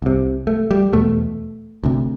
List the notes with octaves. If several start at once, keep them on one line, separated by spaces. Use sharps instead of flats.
C2 C3
A3
G3
E2 B2 A3
D2 C3